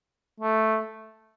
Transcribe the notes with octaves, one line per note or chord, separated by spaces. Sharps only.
A3